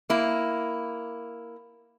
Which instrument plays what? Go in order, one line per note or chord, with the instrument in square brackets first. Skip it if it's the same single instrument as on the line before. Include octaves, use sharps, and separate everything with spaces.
[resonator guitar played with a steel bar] A#3 E4